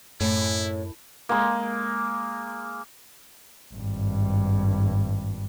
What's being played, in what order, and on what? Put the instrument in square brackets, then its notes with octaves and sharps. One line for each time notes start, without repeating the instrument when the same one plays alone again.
[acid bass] F#2 [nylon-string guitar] A2 [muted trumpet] E4
[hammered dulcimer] G#3 A#3
[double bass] G#1 G2